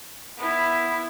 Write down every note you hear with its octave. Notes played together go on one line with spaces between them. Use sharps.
B3 E4